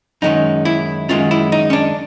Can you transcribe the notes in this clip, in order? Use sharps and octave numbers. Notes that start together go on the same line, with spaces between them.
F#2 D#3 G#3 C#4 D#4
E4
F#2 D#3 G#3 C#4 F4
E4
D#4
C#4
D4